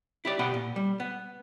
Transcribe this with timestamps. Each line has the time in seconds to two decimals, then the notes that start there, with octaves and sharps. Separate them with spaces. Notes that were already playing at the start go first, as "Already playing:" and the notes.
0.25 E4 G4 D5
0.39 B2 B3 G4 D5 F#5
0.54 A#2
0.76 G3
1.00 B3